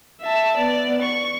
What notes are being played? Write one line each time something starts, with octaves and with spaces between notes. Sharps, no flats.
E5 A5
B3 D5
C#6